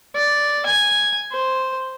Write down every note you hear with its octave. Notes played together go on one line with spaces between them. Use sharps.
D5
G#5
C5